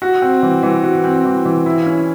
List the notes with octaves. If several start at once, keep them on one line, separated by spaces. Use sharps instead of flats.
F#4
C4
E3
E3
F#4
C4
E3
E3
E4
C#4